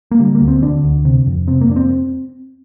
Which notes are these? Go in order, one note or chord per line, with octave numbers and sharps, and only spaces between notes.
A#3
D3 G3
A#3
D2
C4
D3 D4
D2
C3
F2
C3 C4
A#3
F2 D4
C4